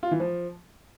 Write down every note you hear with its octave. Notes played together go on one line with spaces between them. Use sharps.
F4
E3
F3